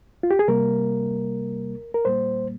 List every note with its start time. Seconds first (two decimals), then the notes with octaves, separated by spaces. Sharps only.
0.23 F4
0.31 G4
0.39 G#4
0.48 C3 G3 A#3 A#4
1.94 A#4
2.05 A#2 G3 A#3 C5